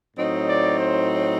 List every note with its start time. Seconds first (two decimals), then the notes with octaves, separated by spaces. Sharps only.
0.17 A2 F#3 C4 D#4 D#5
0.47 D5
0.77 C5